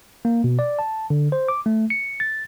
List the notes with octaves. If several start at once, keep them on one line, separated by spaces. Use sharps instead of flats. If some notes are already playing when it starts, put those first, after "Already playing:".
A#3
B2
D5
A5
D3
C5
D6
A3
C#7
A6